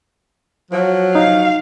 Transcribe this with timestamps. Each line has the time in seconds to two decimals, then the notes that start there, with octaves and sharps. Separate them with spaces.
0.71 F3 F#3
1.15 D#4 F5